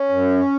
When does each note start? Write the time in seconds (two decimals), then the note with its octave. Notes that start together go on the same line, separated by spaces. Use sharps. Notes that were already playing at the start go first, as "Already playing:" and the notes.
Already playing: C#4
0.09 F#2